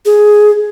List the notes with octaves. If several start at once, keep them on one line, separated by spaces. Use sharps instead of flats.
G#4